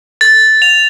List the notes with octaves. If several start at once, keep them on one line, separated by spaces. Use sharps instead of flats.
A6
F7